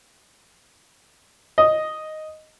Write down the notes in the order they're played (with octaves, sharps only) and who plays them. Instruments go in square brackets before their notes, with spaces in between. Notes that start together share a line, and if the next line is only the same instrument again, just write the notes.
[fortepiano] D#5